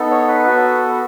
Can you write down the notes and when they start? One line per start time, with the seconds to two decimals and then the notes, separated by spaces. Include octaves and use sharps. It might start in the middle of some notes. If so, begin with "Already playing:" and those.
Already playing: B3 D#4 A4
0.11 C#5
0.28 B4
0.45 B3 F#4 A4